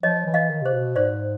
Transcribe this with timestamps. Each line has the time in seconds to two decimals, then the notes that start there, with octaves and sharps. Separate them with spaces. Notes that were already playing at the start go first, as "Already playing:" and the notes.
0.03 F3 C#5 D#5
0.26 E3
0.34 D#5 F5
0.50 D#3
0.61 C3 C5
0.73 B2
0.96 G#2 C5 D5